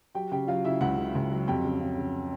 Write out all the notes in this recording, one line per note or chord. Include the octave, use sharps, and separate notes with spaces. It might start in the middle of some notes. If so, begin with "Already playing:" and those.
F#3 G4 G5
C#3 G4 G5
F#3 F4 F5
C#3 E4 E5
C#2 F#4 F#5
C#3
C#2
F#3
F2 G4 G5
C#3
C#3
C#3